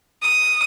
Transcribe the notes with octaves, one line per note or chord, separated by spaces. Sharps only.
D#6